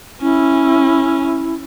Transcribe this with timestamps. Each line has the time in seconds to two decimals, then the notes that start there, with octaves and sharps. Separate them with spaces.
0.21 C#4 E4